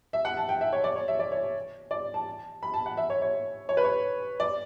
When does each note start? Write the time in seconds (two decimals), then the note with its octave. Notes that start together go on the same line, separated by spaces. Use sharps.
0.13 E5
0.25 F#5
0.37 A5
0.49 G5
0.61 E5
0.73 C#5
0.84 D5
0.96 C#5
1.08 E5
1.19 D5
1.32 C#5
1.91 D5
2.14 A5
2.63 B5
2.74 A5
2.86 F#5
2.97 E5
3.10 C#5
3.22 C#5
3.69 C#5
3.77 B4
3.84 C#5
4.40 D5